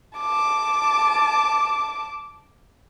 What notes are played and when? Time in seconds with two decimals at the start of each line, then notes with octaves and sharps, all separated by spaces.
0.18 A5 D6